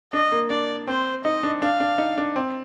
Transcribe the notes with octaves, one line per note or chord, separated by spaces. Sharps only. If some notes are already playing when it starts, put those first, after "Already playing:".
D4 D#5
A#3
D4 D5
C4 C5
D#4 D#5
D4
D4 F5
D4
D#4
D4
C4